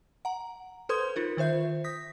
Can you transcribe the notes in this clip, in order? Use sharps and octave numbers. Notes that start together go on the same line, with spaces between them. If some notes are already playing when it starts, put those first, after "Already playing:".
F#5 A#5
A4 B4 C5 C6 D#6 G#6
D#4 F4 A#4
D#3 F4 C5 E5 G6
D#6 G6 A#6 B6